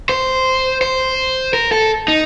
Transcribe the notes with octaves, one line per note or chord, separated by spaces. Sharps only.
C5
C5
A#4
A4
D#4